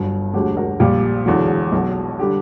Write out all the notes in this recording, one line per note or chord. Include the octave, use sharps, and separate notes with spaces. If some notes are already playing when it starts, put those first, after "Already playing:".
Already playing: G1 G2 F#3
E1 D2 D3 F#3 G4
F#4 A#4
A#1 A#2 G3 G4
E1 E2 D3 F#3
B1 B2 F#3
D3 G3 G4